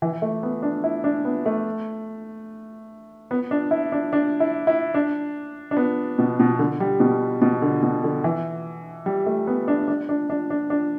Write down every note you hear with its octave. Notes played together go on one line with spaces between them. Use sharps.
E3
A3
B3
D4
E4
D4
B3
A3
B3
D4
E4
D4
D4
E4
E4
D4
D4
B3
B2
B2
D3
G3
B2
B2
D3
B2
D3
E3
G3
A3
B3
D4
D4
D4
D4
D4
D4